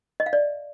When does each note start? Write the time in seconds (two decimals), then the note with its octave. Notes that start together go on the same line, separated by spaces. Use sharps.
0.20 D#5
0.26 F5
0.33 D5